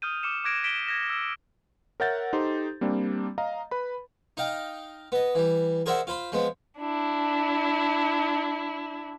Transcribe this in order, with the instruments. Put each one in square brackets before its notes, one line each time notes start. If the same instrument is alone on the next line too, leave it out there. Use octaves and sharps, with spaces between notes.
[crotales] D#6 F6 G6 D#7
D6 F6 C#7 E7
D6 F#6 G#6 A#6 D7 E7
B6 D7 G7
G#6 A#6 E7
E6
[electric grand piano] A#4 C#5 E5 F#5 G6 A6
D#4 G4 A4 C5 C6
G3 A#3 C4 D4
D#5 F5 A#5
B4 B5
[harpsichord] D#4 D#5 F5 G5
B3 D#5
E3 G3
G#4 A#4 C5 D5 E5 F#5
F4 C5 B5 C6
F3 G#3 B3
[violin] D4 E4